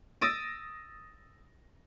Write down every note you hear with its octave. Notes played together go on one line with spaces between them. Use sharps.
D#6 E6 A6 A#6 D7 D#7